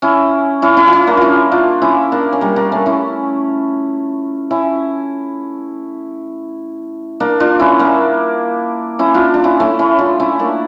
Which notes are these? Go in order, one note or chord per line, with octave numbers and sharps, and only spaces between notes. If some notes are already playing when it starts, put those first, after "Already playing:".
C#4 E4
C#4 E4
C#4 E4
F4
C#4 E4
A#3 D4
C#4 E4 F4
D4 F4
C#4 E4
A#3 D4
C#4
G3 A#3
A#3 D4
A3 C#4
C#4 E4
C#4 E4
A#3 D4
D4 F4
C#4 E4
A#3 D4
C#4 E4
D4 F4
D4
C#4 E4
A3 C#4
C#4 E4
D4 F4
C#4 E4
A#3 D4